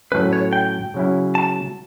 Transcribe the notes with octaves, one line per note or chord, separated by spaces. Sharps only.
A2 F#3 A3 C#4 B4
C#5
G5
C#3 F#3 C#4 E4
A5